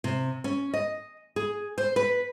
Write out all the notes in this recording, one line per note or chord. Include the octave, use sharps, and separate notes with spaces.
C3
C#4
D#5
G#4
C5
B4